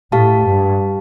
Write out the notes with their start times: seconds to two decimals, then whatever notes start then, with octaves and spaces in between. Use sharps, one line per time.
0.12 A2 G4 F5 A5
0.45 G2